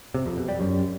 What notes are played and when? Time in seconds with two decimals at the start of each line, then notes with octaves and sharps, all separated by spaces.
0.14 C3
0.26 F2
0.37 B2
0.48 G3
0.60 F#2